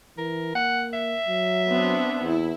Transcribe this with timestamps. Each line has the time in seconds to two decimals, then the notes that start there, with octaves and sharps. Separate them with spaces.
0.18 E3 A#4
0.55 A#3 F#5
0.93 E5
1.27 F#3
1.68 B3 C4 D4
2.23 E2 E4